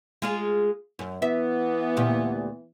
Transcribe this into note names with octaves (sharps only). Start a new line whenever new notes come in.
G#3 F4 G#4
F#2
E3 B3 E5
D2 A#2 G4